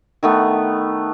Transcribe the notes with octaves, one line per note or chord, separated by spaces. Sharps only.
D#3 A3 B3